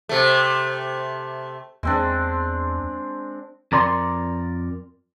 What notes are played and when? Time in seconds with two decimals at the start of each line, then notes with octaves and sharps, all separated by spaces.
0.09 C3 A3
1.83 E2 G#3 C4 D4
3.72 F2 A#4 D5 B5 C6